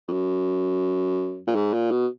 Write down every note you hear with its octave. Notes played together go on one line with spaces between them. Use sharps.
F2
F#2
A#2
G#2
A#2
B2